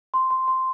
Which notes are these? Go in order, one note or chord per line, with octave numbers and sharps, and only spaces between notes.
C6
C6
C6